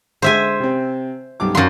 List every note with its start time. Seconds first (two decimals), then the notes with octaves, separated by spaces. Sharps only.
0.22 D3 G#3 C5 E5 G#5
0.60 C3 C4
1.40 B1 G2 D6
1.55 F#2 F#4 F5 F#5 C6